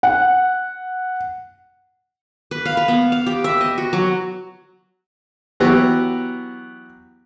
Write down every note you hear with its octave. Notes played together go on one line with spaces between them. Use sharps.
F#5
B4
F5
B4
B3
F5
G4
E5
D#5
F#4
F#3
E3 F#3 B3 F#4 G4